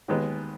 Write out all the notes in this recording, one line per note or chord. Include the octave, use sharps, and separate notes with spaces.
D#2 D#3 G#3 B3